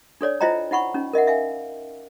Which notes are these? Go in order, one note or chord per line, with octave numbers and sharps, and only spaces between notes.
D4 A4 C#5 D5
E4 F4 C5 D#5 G5 A#5
D#4 E4 F#5 B5 C#6
C#4 D#4
A#4 D#5 E5 F#5
E5 F5 G#5